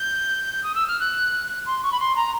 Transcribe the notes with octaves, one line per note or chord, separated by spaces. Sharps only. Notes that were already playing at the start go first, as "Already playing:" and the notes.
Already playing: G6
D#6
E6
F6
F#6
C6
C#6
B5
C6
A#5